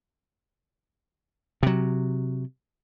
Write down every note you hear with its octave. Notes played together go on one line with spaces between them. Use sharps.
C3 F#3